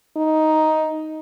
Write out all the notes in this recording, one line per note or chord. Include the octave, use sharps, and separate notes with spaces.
D#4